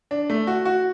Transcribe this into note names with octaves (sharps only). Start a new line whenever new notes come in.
D4
A3
F#4
F#4